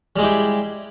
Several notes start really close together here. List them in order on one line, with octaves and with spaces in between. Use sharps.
G3 G#3 E4 G4